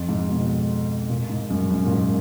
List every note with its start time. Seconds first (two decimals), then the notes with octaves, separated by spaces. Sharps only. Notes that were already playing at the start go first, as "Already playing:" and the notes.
Already playing: F2
0.09 G#2
0.29 B2
1.10 A#2
1.29 G#2
1.50 F#2
1.70 F#2
1.85 A#2
1.91 G#2